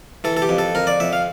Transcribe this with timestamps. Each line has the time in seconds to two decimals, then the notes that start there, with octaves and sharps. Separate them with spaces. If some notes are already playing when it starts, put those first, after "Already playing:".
0.24 E3 A4
0.37 A4
0.42 G4
0.49 F2
0.59 A4
0.75 F2 A#4
0.87 D5
1.00 F2 E5
1.13 F5